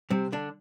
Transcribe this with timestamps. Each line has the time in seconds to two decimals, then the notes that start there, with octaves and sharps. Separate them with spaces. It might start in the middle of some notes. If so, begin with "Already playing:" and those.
0.10 C3 G3 C4
0.32 D3 D4